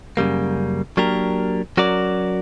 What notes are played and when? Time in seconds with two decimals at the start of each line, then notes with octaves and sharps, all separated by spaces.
0.17 F#2 C#3 G3 A#3
0.97 F#3 A#3 D4 G4 A#4
1.77 F#3 C#4 F#4 A#4 D5